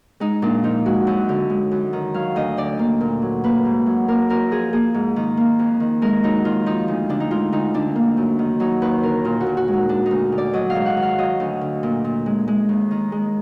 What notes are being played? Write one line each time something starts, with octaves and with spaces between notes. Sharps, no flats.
G#3 D#4
A#2 D4
F3 D#4
G#3 F#4
F#2
D3
G#3
F#2
D#3
F#3 F5
D2 D#5
D3 D5
A#3
A#2
F#3
A#3 B4
G#2
F#3
A#3 A#4
F#2 A#4
F3 G#4
A#3 G#4
G#2
D#3
A#3
F2
D#3
G#3 A#4
F#2 D#4
D#3 F4
F3 D#4
D2
D3 D4
D#4
G#3 F4
D2 D#4
D3 D4
A#3
F#2
D#3
F#3 D#4
D#2 B4
D3 A#4
A#2 F4
F#4
A#2
F#4
G#3
D#4
G#3 D4
D#4
D2
D3
D5
F#3 D#5
F5
G#2
F#5
D#3
F5
F#3 D#5
D2
D3
A#2
A#2
G#3
G#3
D#2
D#3
G#3